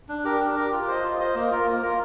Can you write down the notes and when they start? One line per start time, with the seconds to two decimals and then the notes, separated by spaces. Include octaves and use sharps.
0.09 D4
0.24 G4 A#4
0.40 D4
0.56 G4 A#4
0.72 F4
0.88 C5 D#5
1.04 F4
1.19 C5 D#5
1.35 A#3
1.51 F4 A#4
1.67 A#3
1.83 F4 A#4